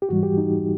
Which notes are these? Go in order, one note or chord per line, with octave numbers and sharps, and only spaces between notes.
G4
G#2 E3 G3 F#4
G4
D#4